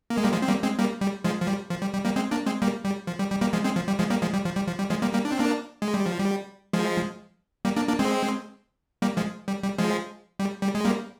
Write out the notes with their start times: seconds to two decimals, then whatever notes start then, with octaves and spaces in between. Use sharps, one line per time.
0.10 A#3
0.17 G#3
0.24 G3 A#3
0.33 F3 G#3
0.42 C4
0.48 G3 A#3
0.63 G#3 C4
0.79 G3 A#3
1.01 G3
1.24 F3 G#3
1.41 F3
1.47 G3
1.70 F3
1.82 G3
1.93 G3
2.05 G3 A#3
2.16 G#3 C4
2.31 A#3 D4
2.46 G#3 C4
2.62 G3 A#3
2.85 G3
3.07 F3
3.19 G3
3.30 G3
3.41 G3 A#3
3.53 F3 G#3
3.64 G#3 C4
3.76 F3
3.88 G3
3.99 F3 G#3
4.10 G3 A#3
4.22 F3 G#3
4.33 G3
4.45 F3
4.56 G3
4.67 F3
4.79 G3
4.90 F3 G#3
5.02 G3 A#3
5.13 G3 A#3
5.25 D4
5.32 C4
5.39 A#3 D4
5.82 G#3
5.94 G3
6.06 F3
6.19 G3
6.73 F3 G#3
7.65 G3 A#3
7.77 A#3 D4
7.88 A#3 D4
7.99 G#3 C4
9.02 G3 A#3
9.17 F3 G#3
9.48 G3
9.63 G3
9.78 F3 G#3
10.39 G3
10.62 G3
10.75 G#3
10.85 G3 A#3